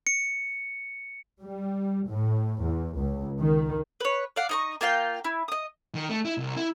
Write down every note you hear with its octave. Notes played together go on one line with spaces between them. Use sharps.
C#7
G3
A2
E2
C#2
D#3
B4 C#5
D5 F5 F#5
D#4 D#5 C#6
A#3 F4 F5 G5
E4
D#5 D#6
D#3
A3
E4
C2
E4